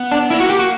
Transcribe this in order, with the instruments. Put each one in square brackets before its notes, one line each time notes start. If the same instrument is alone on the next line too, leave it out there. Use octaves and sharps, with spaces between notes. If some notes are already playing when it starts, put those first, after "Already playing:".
Already playing: [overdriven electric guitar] B3
[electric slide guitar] D4
[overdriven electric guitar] A#3 [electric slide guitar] E4
[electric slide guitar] F#4
G4
F#4